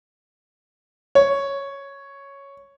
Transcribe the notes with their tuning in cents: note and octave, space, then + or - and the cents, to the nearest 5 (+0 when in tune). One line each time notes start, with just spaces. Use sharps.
C#5 +0